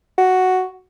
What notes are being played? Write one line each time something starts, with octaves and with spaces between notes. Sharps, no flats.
F#4